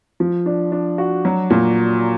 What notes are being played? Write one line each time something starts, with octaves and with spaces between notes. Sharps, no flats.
F3
D4
D4
F#4
F#3
A#2